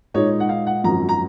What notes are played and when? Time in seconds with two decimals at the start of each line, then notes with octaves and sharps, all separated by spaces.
0.14 A#2 G#3 D#4 C#5
0.40 F#5
0.49 F5
0.67 F#5
0.84 G#1 F#2 F3 A#5
1.09 A#5